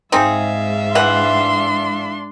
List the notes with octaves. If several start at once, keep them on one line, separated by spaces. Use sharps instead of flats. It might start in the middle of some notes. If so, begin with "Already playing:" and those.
G#2 C4 D#4 G#4 E5 F5
E3 D4 F#5 C6